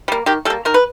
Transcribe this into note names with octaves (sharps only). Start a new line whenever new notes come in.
G3 A#3
D#3 G4
G3 A#3 A4
D#3 A#4
B4